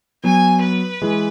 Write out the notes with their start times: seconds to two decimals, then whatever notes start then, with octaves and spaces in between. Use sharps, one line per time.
0.24 F#3 B3 G#5
0.63 B4
1.02 E3 G#3